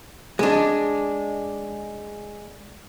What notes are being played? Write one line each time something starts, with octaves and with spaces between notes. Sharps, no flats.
G#3 D4